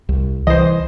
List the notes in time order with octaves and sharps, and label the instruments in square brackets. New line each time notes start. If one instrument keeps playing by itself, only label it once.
[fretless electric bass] C2
[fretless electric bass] C2 E3 [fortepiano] C5 D#5